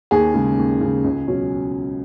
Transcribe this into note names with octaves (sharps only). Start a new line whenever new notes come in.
D#2 G#4
C#3 G#3
D#2
C#3 G#3
C#2
B2 F#3 C#4